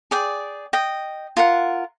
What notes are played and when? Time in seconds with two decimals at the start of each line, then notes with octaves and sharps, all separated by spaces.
0.11 G#4 D5 G5
0.73 D#5 G5
1.37 F4 A#4 F#5